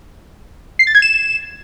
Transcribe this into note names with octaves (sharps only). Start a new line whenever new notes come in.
C7
A6
G#6
E7